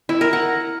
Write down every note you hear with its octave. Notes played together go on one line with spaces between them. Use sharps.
E4
A#4
F#5